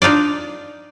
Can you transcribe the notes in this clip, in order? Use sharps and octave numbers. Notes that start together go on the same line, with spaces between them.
D4 D#4 F4 D5